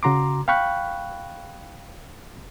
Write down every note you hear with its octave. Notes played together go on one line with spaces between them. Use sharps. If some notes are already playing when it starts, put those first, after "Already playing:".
C#3 F#4 A#5 C6 D6
F5 G5 B5 C#6 F#6